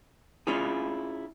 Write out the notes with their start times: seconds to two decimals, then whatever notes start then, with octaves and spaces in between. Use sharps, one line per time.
0.47 C#4 E4 F4 G#4